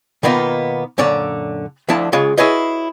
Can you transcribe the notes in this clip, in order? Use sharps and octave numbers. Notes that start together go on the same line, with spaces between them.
B2 D#3 A#3 B3 D#4 F4
F#2 A#2 D3 C#5 D5
D2 D3 F3 E4 A5
C#2 C#3 G#3 F4 C#5
E4 F#4 G#4 B4 C#5 D#5